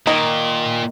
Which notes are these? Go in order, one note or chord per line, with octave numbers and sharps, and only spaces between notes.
A#2 D#3